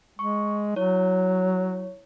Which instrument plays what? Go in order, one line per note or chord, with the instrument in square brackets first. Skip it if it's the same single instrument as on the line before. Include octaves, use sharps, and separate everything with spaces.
[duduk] G#3 [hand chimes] C#6
[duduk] F#3 [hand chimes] E4 C#5